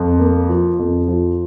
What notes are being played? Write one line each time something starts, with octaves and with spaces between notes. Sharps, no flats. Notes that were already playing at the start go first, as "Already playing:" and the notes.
Already playing: F2
A#3
F3
F2
F3